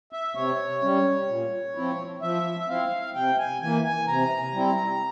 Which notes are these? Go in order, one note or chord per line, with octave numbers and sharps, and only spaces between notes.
E5
C3 C#5
G3 C#4
A#2
F3 C4 E4
F3 E5
E5
C4 E4 F5
C3 G5
G#5
E3 A#3 G#5
G#5
C3 A#5
G3 C4 E4